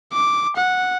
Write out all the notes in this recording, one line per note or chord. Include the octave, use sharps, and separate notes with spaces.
D6
F#5